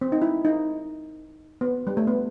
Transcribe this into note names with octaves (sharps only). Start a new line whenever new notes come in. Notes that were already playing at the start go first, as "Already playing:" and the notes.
C4
D#4
E4
D#4
B3
G3
A3
B3